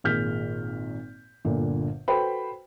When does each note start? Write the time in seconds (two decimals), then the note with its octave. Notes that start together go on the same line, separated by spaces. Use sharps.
0.04 G#1 A#2 G#4 F6 G6 B6
1.45 G1 A#2 D3
2.08 F#4 A4 B4 C5 G5 B5